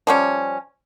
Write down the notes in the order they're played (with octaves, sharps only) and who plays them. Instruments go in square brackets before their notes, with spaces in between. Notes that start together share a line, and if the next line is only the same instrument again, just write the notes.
[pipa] F3 G3 C#4